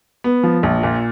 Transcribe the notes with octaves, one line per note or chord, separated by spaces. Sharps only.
B3
F3
A#1
A#2